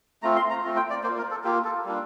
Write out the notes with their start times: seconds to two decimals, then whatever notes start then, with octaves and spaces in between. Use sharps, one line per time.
0.23 A3 C4 F4 A#5
0.36 C6
0.50 A#5
0.64 A3 C4 F4
0.76 G5
0.90 D5
1.03 A#3 C5
1.08 F4
1.17 A#4
1.31 A4
1.44 A#3 F4 G4
1.65 A4
1.85 G3 A#3 D4 F4